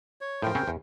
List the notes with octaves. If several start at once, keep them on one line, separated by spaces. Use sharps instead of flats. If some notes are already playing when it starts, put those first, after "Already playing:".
C#5
A2 F3 A#4 C5 G5
C#3 C4 C#4
E2